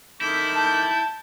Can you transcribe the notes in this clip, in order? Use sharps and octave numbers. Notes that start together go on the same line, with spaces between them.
D#3 E4 A4 D6 G6
A5 G6